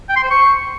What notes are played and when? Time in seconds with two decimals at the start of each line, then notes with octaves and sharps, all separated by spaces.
0.09 G5
0.16 C6
0.23 C5
0.30 C#6